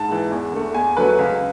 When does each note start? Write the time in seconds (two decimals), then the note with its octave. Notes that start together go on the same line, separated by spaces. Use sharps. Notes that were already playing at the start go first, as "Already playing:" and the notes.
Already playing: G#2 A5
0.09 E3 G#3
0.31 E2
0.52 D3 A3
0.74 E2 G#5
0.96 D3 F#3 A3 B4
1.19 C#2